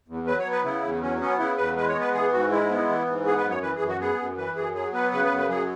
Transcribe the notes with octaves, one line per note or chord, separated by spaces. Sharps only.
E2
F#3 B4
C#5
B3
B4
C#3 E4
E2
F#3 C#4
B3 C#4
C#3 E4
E2 B4
G#3 B4
C#5
B3
B4
E3 G#4
G#2 F#4
G#3 E4
B3
E3
G#2
B3 G#4
B4
F#2
C#5
E3 B4
G#4
F#2
F#4
B3 G#4
F#2
E3 B4
F#2 G#4
F#3 G#4
B3 B4
C#3 B4
B4
F#2
B4
F#3 G#4